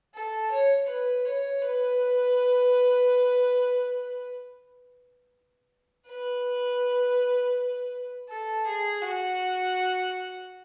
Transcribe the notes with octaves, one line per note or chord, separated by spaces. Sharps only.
A4
C#5
B4
C#5
B4
B4
A4
G#4
F#4